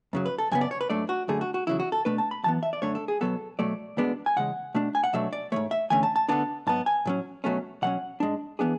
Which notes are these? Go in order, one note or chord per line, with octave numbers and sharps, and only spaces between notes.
F#2 C#3 F#3
B4
A4
F#2 C#3 B3 G#5
D5
C#5
B4
G#2 F#3 A3 D4 D5
F#4
F#2 D3 A3 G#4
F#4
F#4
E2 C#3 F#3 E4
F#4
A4
B2 A3 D4 B4
A5
B5
F#2 E3 B3 A5
E5
D5
F#2 D3 A3 D4 C#5
A4
G#4
B1 B2 F#3 B3 A4
B2 F#3 A3 D5
D2 D3 G#3 B3 D4
G#5
E2 C#3 G#3 F#5
B2 A3 D4
G#5
F#5
B1 B2 F#3 A3 D4 E5
D5
G#2 E3 A3 C#5
E5
E2 D3 A3 C#4 G#5
A5
A5
D2 D3 G#3 B3 D4 A5
G#2 F#3 B3 A5
G#5
A2 F#3 C#4
B2 F#3 A3 C#4
B2 F#3 C#4 F#5
G#2 G#3 D4
E3 G#3 B3 D4 G#4